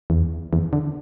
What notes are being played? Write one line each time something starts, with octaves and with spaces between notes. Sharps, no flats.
E2
E2
D3